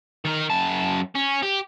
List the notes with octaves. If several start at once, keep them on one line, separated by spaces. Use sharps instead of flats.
D#3 A#4
F#2 A5
C#4
G4